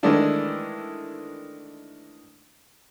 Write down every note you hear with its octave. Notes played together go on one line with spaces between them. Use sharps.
D#3 E3 G#3 A3 D4 E4